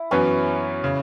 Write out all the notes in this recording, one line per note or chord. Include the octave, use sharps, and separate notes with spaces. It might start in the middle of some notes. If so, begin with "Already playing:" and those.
Already playing: E4
F#2 E3 B3 C#4
C#3